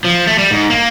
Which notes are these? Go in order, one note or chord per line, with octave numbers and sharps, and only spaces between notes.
F3
A3
G3
G#2
A#3